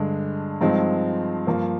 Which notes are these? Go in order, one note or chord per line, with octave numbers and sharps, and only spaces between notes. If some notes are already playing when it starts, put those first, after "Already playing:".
Already playing: G2 D3 G#3
G2 F3 G#3 C4 D#4
G2 F3 A#3